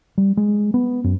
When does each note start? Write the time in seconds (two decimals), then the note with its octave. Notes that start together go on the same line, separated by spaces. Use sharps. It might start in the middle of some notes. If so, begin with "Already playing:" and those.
0.18 G3
0.37 G#3
0.74 B3
1.04 F#2